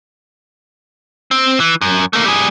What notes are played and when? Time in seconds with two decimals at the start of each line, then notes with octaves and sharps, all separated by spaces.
1.31 C4
1.60 E3
1.81 F#2
2.13 A3 A#3
2.26 G3 G#4